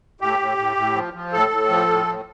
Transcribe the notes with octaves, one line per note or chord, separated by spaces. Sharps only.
A2 G4
A2
A2
A2
F3
F3
A2 A4
A2
F3
A2
A2